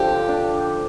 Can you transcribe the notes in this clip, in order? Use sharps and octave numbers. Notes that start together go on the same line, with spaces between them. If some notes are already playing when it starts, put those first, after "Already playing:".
Already playing: D3 F3 G4 A4
D4
D4